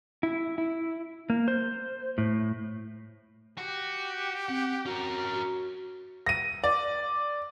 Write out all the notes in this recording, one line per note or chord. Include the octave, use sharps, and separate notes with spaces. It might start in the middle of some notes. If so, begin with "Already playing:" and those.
E4
E4
A#3
C5
A2
F#4 G4
C4 F#5
C#4 F#4 A#4
F#4
A#6 D#7
D5